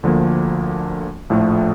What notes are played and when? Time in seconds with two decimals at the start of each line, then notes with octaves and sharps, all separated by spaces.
0.03 D2 D3 F3 A#3
1.30 A#1 A2 F3 A3